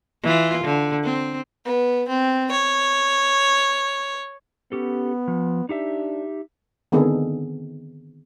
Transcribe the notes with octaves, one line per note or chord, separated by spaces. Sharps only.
E3 F4
D3
C4
B3
C4
C#5
B3 C#4 G4 A4
F3
D4 D#4 G4 E5
D3 D#3 B3 C4 G#4 A4